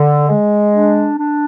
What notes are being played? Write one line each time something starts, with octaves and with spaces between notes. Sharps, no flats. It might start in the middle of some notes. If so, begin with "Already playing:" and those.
Already playing: D3
G#3
D4
D4